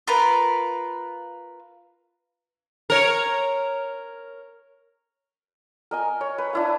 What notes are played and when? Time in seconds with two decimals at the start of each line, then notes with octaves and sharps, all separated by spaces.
0.07 F4 A#4 B4
2.90 A#4 C#5
5.91 A#4 D#5 G#5
6.21 C#5
6.38 B4
6.53 D4 E4 F5